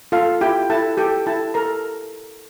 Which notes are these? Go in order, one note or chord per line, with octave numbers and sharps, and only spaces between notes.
F4 A4 F5
E4 G4 G5
E4 A4 A5
G4 A4 G5
E4 A4 A5
A4 A#4 A#5